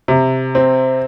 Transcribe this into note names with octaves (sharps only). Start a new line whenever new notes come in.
C3
C4